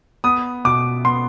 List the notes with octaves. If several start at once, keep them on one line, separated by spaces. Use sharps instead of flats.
B3 D#6
B2 D6
B3 C6